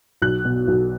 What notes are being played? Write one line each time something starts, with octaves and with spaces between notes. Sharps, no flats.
B1 F#6
B2
B1